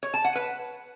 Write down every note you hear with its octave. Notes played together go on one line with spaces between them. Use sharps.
C#5
A5
F#5
B4